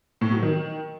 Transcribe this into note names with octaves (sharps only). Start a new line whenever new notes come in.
A2
F#3
D#3